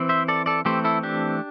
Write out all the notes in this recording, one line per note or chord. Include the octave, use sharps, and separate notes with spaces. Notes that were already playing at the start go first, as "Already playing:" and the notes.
Already playing: E3 C4
C5 E5
A4 D5
A4 D5
E3 A3 C4 G4 C5
E4 A4
D4 G4